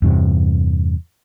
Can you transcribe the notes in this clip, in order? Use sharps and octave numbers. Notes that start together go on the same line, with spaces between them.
E2 G2 C3